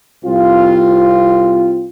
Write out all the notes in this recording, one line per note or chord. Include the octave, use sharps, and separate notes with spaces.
C2 C4 F4